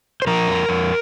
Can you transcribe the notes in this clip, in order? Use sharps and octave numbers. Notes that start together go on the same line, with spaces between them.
C5
F3 A#4
F2
F2